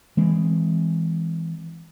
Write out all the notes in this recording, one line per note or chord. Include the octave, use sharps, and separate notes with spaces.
E3 G#3 C4